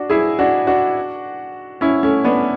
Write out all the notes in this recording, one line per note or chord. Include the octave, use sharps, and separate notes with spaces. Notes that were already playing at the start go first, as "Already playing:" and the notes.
Already playing: D4 F#4
E4 G#4
D4 F#4
D4 F#4
C#4 E4
A3 C#4
B3 D4